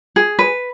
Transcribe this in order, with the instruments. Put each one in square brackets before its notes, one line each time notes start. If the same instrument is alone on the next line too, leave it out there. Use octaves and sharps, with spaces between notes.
[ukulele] G#4
B4